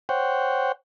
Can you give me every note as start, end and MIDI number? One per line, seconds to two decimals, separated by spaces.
0.09 0.72 72
0.09 0.72 73
0.09 0.72 78
0.09 0.72 79